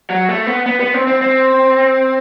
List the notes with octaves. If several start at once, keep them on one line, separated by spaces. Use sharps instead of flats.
F#3
A3
B3
B3
B3
C4
C4
C4